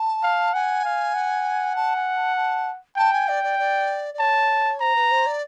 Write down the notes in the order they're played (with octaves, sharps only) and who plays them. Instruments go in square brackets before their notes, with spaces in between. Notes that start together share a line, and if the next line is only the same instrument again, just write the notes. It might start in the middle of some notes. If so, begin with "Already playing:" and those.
Already playing: [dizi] A5
[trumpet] F5
[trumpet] F#5 [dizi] G#5
[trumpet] F5
F#5
[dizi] A5
G#5
A5
A5
[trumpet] G5 [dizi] A5
[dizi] G#5
D5
D5
D5
D5
[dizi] C#5 [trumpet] A5
[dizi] C5 [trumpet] A#5
[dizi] B4
C5
D5